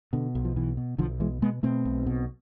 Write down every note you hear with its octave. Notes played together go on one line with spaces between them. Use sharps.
B2 D3
B1
F3
B2 E3
B2
B1 D3 F3
B2 E3 G#3
B2 G#3 B3
B2 A3 C4
B1
B2